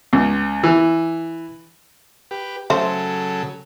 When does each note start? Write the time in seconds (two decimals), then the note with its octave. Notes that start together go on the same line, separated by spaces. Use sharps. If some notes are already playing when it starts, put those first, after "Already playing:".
0.13 C#2
0.63 E3
2.31 G4 B4
2.70 C#3 F#3 A3 A4 C5